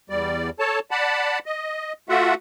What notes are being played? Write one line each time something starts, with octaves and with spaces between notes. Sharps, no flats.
E2 G3 D5
A4 C#5 A5
D5 F#5 A5 B5
D#5
A3 F4 F#4 E5 F#5